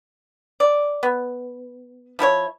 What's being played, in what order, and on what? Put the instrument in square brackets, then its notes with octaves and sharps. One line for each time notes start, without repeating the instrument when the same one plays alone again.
[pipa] D5
B3
F3 E4 A#4 C#5